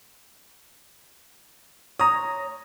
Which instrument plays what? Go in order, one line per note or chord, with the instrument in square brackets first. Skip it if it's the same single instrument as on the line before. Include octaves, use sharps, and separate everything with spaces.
[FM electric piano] C#5 A#5 [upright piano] D#6